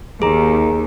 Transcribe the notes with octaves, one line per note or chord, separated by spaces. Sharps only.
D#2 G#4 A#5